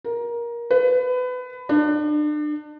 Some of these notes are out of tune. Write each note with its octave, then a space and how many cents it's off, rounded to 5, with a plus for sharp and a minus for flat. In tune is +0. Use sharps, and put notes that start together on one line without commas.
A#4 +20
B4 +25
D4 +35